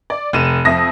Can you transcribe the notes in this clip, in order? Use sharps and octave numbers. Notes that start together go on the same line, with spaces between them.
D5
F1 D#7 E7
F2 E5 D#6 A#6